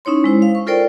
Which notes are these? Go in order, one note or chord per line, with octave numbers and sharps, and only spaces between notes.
C#4 D#4 E4 C#5 C6
G#3 E4 C5
F5
C#6
F4 A4 A#4 C5 D5 G5